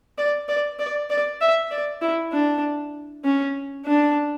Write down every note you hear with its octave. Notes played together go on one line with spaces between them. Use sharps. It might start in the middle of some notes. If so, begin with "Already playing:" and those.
D5
D5
D5
D5
E5
D5
E4
D4
C#4
D4